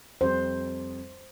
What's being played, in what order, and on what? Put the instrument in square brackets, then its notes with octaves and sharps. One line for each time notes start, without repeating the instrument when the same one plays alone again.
[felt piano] F2 G3 C4 [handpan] C5